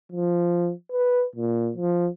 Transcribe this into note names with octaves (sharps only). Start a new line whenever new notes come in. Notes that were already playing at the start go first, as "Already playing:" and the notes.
F3
B4
A#2
F3